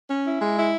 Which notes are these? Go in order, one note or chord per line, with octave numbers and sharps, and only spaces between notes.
C#4
E4
G#3
E4